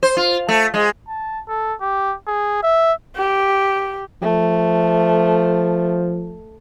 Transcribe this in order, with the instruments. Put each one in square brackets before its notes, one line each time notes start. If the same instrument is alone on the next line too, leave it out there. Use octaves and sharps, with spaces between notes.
[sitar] C5
F4
A3
G#3
[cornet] A5
A4
G4
G#4
E5
[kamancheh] G4
[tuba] F3 [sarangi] A3